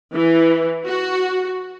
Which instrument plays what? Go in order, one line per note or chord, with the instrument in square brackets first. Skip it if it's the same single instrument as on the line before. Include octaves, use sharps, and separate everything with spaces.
[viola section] E3
F#4